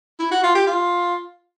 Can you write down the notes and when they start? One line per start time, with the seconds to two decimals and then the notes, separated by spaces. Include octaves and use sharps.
0.19 E4
0.31 F#4
0.43 F4
0.55 G4
0.67 F4